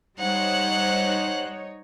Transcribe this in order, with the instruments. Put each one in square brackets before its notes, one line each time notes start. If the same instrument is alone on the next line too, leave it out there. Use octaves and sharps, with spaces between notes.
[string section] G3 C5 F#6 [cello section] D#4 C#5 [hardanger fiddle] F#5